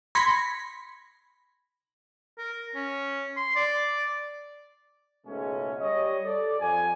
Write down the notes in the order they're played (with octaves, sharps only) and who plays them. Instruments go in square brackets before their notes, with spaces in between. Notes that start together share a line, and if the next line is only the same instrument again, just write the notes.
[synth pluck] B5 C6 G#6 A#6 B6 C#7
[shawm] A#4
C#4
C6
D5
[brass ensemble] C#2 G#2 B2 G#3 A3 C#4
G3 C#5 D#5
A4 D5
F2 G#5